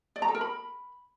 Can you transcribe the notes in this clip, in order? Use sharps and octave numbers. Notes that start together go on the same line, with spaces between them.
D5
A#5
A4
A#4
B5